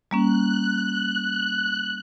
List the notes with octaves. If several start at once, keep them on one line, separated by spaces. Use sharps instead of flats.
G3 A#3 C#4 F#6